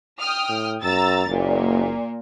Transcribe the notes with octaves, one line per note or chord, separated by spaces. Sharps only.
G5 D#6 F6
A2
F#2 A#5 E6 A6
F#1 A#2 A#3